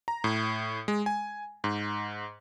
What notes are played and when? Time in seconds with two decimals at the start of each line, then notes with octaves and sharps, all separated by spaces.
0.08 A#5
0.24 A2
0.88 G#3
1.06 G#5
1.64 G#2